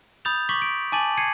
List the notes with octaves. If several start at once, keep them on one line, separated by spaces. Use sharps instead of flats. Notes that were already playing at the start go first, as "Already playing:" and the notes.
B5 D#6 G6 A6 F7
C#6 D6 B6 F#7
D7
G#5 A5 D6 A6 D#7 F#7
G#6 C7 C#7 D#7